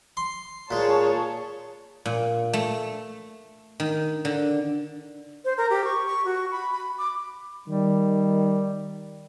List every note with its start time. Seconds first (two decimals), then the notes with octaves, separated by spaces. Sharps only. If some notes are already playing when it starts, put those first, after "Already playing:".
0.17 C6
0.71 A#2 G#3 G#4 C#5 A5
2.06 A#2
2.53 A3
3.80 D#3
4.25 D3
5.45 C5
5.58 A#4
5.70 G4
5.85 C#6
6.06 C#6
6.25 F#4
6.52 B5
6.71 B5
6.98 D6
7.68 D#3 G3